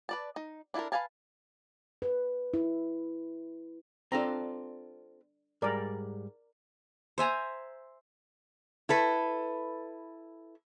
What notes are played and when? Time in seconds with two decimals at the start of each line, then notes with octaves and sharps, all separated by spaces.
0.09 B4 D5 A5
0.36 D#4
0.74 D4 E4 F#4 A4 A#4
0.92 B4 C5 F5 G#5 A5
2.02 B4
2.54 E4
4.12 C4 D4 F4 A4 A#5
5.62 G#2 G3 A#4 D5
7.18 C5 E5 G#5 A#5
8.89 E4 A4 B4